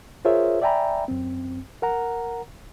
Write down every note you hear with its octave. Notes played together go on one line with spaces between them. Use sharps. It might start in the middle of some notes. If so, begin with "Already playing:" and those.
F4 G#4 A#4 C5 C#5 E5
D5 E5 G5 G#5 A#5 B5
F#2 C4
A#4 F#5 A#5